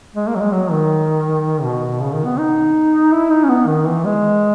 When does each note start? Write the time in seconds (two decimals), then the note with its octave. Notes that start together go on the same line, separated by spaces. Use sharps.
0.15 G#3
0.28 A#3
0.35 F#3
0.40 G#3
0.52 F#3
0.71 D#3
1.63 B2
2.01 C#3
2.13 D#3
2.25 B3
2.38 D#4
3.12 E4
3.30 D#4
3.44 C#4
3.49 B3
3.67 D#3
3.86 E3
4.05 G#3